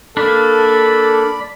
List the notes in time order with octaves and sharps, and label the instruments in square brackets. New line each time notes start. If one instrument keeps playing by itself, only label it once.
[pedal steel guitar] A#3 D4 [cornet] A4 [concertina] D5 B5